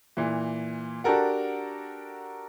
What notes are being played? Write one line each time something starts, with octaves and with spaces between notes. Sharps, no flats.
A#2 E3
D4 F#4 G4 A4 A#4 F#5